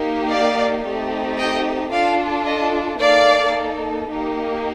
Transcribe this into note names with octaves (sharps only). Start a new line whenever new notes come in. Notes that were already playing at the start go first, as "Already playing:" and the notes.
Already playing: A#3 D#4 G4
D5 F5
A3 C4 D#4 G4
D#5 G5
D4 F4 A4 D5 F5
D#5
A#3 D#4 A4 D5 F5
A#3 D#4 G4